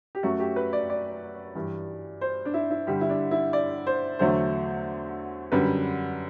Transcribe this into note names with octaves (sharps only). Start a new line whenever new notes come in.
G4
F#2 F#3 A3 F#4
G4
B4
D5
D5
G2 E3 G3
C5
D4
E4
E4
G2 D3 G3 G4
E4
D4
E4
D5
C5
E2 D3 F#3 A3 C5
F#2 D3 G3 B4